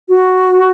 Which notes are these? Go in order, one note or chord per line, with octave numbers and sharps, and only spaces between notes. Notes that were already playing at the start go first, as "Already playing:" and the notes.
F#4